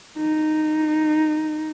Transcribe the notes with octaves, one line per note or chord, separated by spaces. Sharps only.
D#4